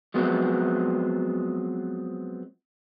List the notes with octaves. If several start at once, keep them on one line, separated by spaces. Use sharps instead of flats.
F3 F#3 G#3 B3 C4